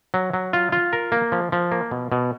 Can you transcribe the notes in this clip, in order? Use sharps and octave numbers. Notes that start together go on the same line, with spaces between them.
F#3
F#3
F4
F4
A#4
A#3
F3
F3
A#3
B2
B2